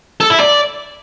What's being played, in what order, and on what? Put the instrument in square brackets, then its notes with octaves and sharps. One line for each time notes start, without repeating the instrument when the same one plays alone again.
[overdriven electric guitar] A4
E4
D5